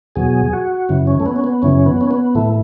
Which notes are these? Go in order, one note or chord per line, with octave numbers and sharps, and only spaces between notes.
E2 B2 F#3 G#4
F#4
F#2 C#3 E3
C#4
A3
B3
C#4
B3
F#2 C#3 E3 C#4
B3
C#4
B3
A2 E3 A3